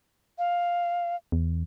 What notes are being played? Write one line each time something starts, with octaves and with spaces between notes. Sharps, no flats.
F5
E2